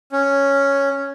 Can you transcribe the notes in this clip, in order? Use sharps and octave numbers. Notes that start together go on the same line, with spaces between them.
C#4